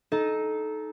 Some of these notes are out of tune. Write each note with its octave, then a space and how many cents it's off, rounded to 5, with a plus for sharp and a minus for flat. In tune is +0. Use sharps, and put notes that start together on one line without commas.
D#4 +0 A4 -20 D#5 +0